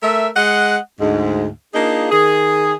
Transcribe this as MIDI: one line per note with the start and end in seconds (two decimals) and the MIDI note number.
0.02 0.28 57
0.02 0.28 70
0.02 0.28 76
0.35 0.77 56
0.35 0.77 75
0.35 0.77 78
1.00 1.47 38
1.00 1.47 44
1.73 2.08 58
1.73 2.08 62
1.73 2.08 63
1.73 2.08 65
1.73 2.08 68
2.11 2.74 51
2.11 2.74 68